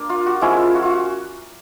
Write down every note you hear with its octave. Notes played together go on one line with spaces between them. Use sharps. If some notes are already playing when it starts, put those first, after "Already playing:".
Already playing: A#3 D4 A#4
F4
F#4
F3 G#3 C#4 E4 F4
F#4
F4
F#4